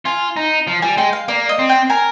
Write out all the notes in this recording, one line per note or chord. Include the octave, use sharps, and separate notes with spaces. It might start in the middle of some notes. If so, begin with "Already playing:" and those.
F4 G#5
D#4
F3
G3 G#5
G#3 G5
F5
A#3 D5
D#5
C4
G5
A#4 G#5